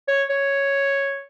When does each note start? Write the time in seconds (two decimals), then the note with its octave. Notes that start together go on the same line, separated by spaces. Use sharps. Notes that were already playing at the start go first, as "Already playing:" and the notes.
0.08 C#5
0.30 C#5